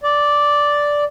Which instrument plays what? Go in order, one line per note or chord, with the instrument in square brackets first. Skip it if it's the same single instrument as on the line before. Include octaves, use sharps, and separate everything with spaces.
[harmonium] D5